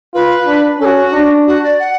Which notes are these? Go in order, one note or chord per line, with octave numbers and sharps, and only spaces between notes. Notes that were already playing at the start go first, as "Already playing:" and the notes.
F4 B4
D4
C#4 F#4 A4
D4
F#4
D5
F#5